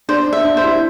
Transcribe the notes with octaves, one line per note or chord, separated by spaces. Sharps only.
D4 C5
D4
E5
D4
C5
E4